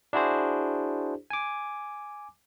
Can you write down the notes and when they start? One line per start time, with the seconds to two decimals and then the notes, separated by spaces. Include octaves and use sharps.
0.13 D4 E4 F#4 G#4 C5
1.30 G#5 D6